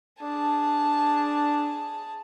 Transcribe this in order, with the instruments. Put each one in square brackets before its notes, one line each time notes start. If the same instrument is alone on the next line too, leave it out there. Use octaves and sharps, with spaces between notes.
[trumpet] D4 [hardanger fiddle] G#4 A5